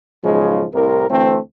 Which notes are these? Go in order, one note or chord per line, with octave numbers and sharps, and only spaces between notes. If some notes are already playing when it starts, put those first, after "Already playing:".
B1 G#2 C#3 F3 G#3
C2 A2 C3 A#4
D2 E3 A3 C4